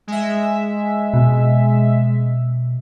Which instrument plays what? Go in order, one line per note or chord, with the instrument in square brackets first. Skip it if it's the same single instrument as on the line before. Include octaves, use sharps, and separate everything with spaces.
[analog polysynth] G#3 E5
[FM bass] B2